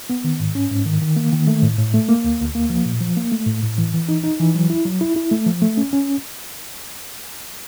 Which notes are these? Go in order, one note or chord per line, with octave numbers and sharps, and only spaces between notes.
B3
D#3
G#2
C#4
G#2
D#3
D#3
A#3
D#3
A3
A2
A2
A3
A#3
D2
D2
A#3
F3
A#2
F3
A#3
A3
A2
A2
E3
E3
D#4
D#4
E3
F#3
E4
F#3
E4
E4
A3
F3
A3
C#4
C#4